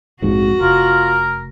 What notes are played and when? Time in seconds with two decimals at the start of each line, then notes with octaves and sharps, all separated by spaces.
0.22 A#1 F2 G#2 F#4
0.61 F1 F4 A#4